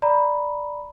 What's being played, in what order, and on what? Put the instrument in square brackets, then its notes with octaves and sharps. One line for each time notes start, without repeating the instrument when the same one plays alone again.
[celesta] D5 A#5 B5